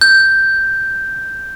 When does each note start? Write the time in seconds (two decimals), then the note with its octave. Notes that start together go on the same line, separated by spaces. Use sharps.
0.01 G6